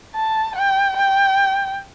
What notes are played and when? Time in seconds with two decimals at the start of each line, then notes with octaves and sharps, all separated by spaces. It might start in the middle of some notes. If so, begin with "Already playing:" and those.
0.15 A5
0.56 G5
0.97 G5